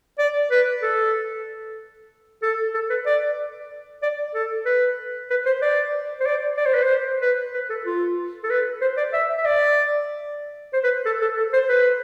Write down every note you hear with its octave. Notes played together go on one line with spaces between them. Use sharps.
D5
B4
A4
A4
A4
B4
D5
D5
A4
B4
B4
C5
D5
C5
D5
D5
C5
B4
C5
B4
B4
A4
F4
A4
B4
C5
D5
E5
E5
D5
C5
B4
A4
A4
A4
C5
B4